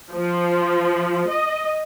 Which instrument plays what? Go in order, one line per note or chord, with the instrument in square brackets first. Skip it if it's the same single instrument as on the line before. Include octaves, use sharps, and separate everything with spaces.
[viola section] F3
D#5